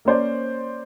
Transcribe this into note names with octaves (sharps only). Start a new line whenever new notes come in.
A#3 C#4 C5 D5